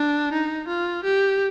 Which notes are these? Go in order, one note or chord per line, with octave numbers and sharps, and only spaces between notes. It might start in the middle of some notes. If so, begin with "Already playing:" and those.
Already playing: D4
D#4
F4
G4